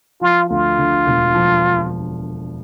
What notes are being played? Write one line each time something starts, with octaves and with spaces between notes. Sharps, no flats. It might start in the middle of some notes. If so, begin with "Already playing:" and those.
F3 F4
D2 F4
D3
E1
F3